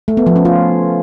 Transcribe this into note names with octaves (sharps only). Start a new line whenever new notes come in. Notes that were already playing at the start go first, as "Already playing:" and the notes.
A3
B3
F3
C#4
F4